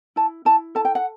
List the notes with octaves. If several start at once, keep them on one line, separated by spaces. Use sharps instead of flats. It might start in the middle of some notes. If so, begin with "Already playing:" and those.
E4 A5
E4 A5
A4 A5
G5
F#5